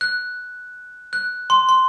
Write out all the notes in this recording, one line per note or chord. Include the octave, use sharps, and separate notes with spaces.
F#6
F#6
C6
C6